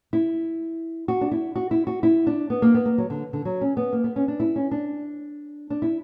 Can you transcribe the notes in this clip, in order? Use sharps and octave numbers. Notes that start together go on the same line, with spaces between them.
E4
F#4
D4
E4
F#4
E4
F#4
E4
D4
B3
A#3
B3
A#3
F#3
D3
D3
F#3
C#4
B3
A#3
B3
C#4
D4
E4
C#4
D4
D4
E4